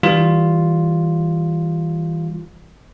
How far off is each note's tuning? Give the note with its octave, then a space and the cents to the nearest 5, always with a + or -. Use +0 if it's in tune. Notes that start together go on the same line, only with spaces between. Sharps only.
E3 -25 G3 +0 F4 +0